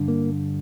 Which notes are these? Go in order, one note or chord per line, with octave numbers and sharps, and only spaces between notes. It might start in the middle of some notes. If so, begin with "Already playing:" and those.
Already playing: G2 D3
A#3